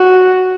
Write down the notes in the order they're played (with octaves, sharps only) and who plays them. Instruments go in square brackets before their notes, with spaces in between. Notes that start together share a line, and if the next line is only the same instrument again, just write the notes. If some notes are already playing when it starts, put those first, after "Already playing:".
Already playing: [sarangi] F#4